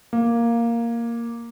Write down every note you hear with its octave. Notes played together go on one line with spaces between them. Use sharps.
A#3